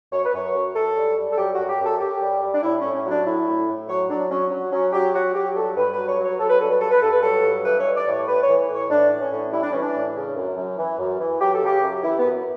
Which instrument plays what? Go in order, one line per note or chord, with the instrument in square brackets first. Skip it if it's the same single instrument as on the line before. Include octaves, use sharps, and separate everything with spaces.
[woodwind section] F#2 C#5
B4
F#2 C#5
F#2
F#2 A4
G3
G3
A4
F#2 G4
F#4
F#2
G4
F#2
A4
F#2 G4
G3
G3
D4
A2 E4
A2 C#4
C#4
F#3
D4
A2 E4
A2
A2
F#3 C#5
F#3 D4
F#3 C#4
F#3
F#3 C#4
F#3 G4
F#3 F#4
F#3 G4
G2 A4
G2 B4
B4
F#3
C#5
F#3
C#5
F#3 A4
B4
G2 A4
B4
G2 A4
B4
G2 A4
B4
F#3 A4
G2
E3 B4
C#5
G3
D5
A2
C#5
G3 B4
E3 C#5
A2 C#5
A2 D4
E3
C#4
A2
G3 E4
D4
E3 C#4
D4
A2
C#3
F#2
F#2
E3
F#2
E3
F#2 G4
A4
C#3 G4
F#2
E3 E4
B3
F#2